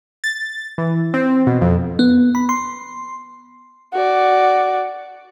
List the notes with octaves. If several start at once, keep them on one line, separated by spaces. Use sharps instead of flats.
A6
E3
C4
B2
F2
B3
B5
C6
F#4 D5